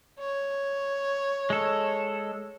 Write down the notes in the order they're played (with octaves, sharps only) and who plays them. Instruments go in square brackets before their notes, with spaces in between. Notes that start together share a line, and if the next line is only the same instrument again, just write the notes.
[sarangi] C#5
[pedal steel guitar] G#3 A4